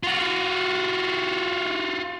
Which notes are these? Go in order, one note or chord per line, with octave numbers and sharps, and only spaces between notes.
F4 F#4